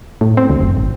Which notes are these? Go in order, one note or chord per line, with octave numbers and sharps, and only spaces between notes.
A2
C4
D2
F#1
G#1